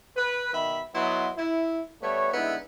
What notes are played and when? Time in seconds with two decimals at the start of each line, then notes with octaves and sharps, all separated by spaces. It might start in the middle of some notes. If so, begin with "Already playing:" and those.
0.17 B4
0.54 B2 D#3 E5 B5
0.94 F#3 B3 E4 D#5 F#5 C6
1.37 E4
2.02 G3 A3 B3 C#5
2.33 D3 G#3 B3 D#4 E4